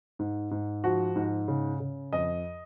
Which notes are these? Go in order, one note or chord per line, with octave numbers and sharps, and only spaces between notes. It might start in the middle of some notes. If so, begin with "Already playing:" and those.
G#2
G#2
F3 F#4
G#2
C#3
C#3
F2 D#5